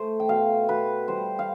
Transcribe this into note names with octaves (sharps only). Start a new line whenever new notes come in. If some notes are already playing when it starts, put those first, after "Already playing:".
Already playing: A3 C5
G5
B2 F5
B2 B4
G3 C5
F5